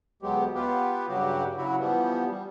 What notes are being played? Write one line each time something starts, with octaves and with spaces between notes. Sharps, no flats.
D2 F#3 G#3 B3 G4
B3 F4 G4 B4
G2 C#3 F#3 F#4 G4
C#3 F#3 E4 F#4
E3 F3 G3 B3
G3